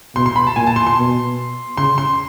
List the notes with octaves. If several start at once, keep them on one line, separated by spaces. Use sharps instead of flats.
B2 C6
C6
B5
A5
A#2 G#5
A5
C6
C6
B2
C#3 C6
C6